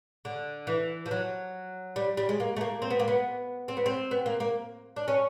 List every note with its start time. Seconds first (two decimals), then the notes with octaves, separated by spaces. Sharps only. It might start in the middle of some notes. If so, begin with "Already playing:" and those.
0.25 D3
0.67 E3
1.06 F3
1.11 F#3
1.96 G3
2.17 G3
2.29 G#3
2.40 A#3
2.57 A3
2.61 A#3
2.82 C4
2.90 B3
3.00 A#3
3.08 B3
3.68 C4
3.77 B3
3.86 C4
4.11 B3
4.26 A#3
4.40 A#3
4.96 D4
5.08 C#4